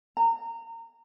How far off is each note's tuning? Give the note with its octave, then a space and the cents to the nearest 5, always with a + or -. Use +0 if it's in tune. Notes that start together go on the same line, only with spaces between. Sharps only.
A#5 -25